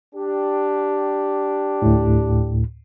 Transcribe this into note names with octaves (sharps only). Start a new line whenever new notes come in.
D4 G4
D2 A2